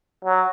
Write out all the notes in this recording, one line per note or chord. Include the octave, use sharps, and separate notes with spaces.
F#3